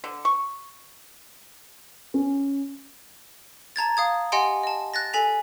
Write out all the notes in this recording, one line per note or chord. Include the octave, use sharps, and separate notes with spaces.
D3
C#6
C#4
A5 A#5 G#6 A6
F5 D#6 G#6
G4 D#5 F#5 G#5 C6 D7
D#5 A5
F#6 A6 A#6
A4 G#5 B6 F7